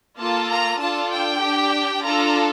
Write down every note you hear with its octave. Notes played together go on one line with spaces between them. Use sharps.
A#3 F4 A4 A5
A#5
D4 F4 A4 A5
G5
D4 G4
D4 F4 A4 A#5